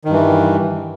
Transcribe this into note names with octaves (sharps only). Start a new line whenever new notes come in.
G2 D#3 E3